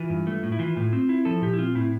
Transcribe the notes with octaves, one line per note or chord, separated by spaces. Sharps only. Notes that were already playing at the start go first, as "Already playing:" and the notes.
Already playing: E3 F4
G2
A3
A2
E4
E3 F4
A2
C4
E4
F3 A4
A#2 G4
E4
C4 F4
A2 E4